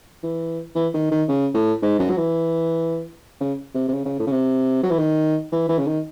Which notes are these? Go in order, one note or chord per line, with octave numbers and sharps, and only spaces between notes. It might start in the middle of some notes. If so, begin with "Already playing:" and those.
E3
E3
D#3
D#3
C#3
A2
G#2
F#2
F#3
E3
C#3
C3
C3
C#3
C#3
A2
C#3
C3
F#3
E3
D#3
E3
E3
C#3
D#3